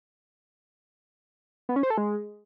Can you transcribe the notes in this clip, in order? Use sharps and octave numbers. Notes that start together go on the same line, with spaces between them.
B3
C#4
C5
A4
G#3